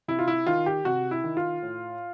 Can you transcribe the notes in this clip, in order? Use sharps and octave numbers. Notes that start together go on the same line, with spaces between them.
C3 E4
F4
E4
D#3 F4
G4
C3 F#4
E4
D#3
F4
A2